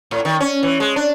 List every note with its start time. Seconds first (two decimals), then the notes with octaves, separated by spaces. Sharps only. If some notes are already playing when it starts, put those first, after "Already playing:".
0.11 A2
0.25 D#3
0.40 C#4
0.63 E3
0.80 G#3
0.96 D4